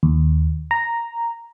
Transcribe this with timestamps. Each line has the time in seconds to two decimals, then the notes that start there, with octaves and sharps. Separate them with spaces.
0.03 D#2
0.71 A#5